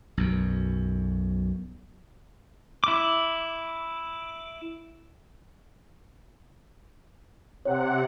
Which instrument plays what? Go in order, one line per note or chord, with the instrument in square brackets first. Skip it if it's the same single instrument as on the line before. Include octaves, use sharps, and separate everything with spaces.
[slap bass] B1 F#2
[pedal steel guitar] E4 D6
[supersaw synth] C3 F#5 [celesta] C#5